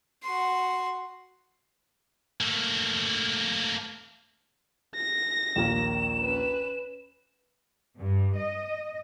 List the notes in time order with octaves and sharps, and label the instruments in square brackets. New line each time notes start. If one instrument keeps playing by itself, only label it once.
[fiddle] F#4 C6
[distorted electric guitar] A3 A#3
[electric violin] A#6
[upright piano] A#1 D#2 A#3 [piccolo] E7
[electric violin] C#4 B4
[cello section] G2
D#5